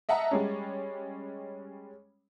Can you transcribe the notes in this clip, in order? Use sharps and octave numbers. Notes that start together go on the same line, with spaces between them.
D#5 E5 F#5 A5 A#5
G3 G#3 C#4